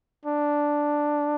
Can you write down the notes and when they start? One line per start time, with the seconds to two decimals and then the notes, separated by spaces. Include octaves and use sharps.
0.25 D4